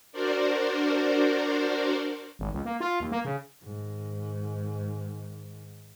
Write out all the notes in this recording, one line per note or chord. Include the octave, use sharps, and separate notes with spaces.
D4 F#4 A#4 C5 D5
G#1
C#2
A#3
F4
D#2
A#3
C#3
G#2 D#3